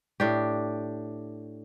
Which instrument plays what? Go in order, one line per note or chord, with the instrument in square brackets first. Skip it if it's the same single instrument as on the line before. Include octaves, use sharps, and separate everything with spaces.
[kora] A2 D4 G4